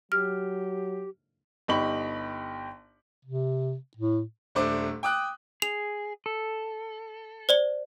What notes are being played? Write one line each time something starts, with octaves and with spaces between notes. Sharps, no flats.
F#3 G4 F6
G1 D#4 G4 B5 C#6 F#7
C3
A2
D#1 A3 D4 C5 D6
G5 D6 D#6 F#6
G#4 F7
A4
C5 D5 G7